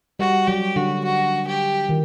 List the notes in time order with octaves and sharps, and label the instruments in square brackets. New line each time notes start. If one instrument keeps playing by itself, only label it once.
[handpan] G3 [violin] F#4
[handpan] F#3 [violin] G4
[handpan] D3 [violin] F#4
[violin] F#4
G4
[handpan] D#3